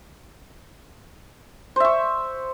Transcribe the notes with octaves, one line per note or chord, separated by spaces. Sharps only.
C5 E5 C#6